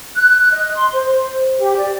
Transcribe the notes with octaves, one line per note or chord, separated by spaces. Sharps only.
F#6
D#5
C6
C5
C5
G4
D5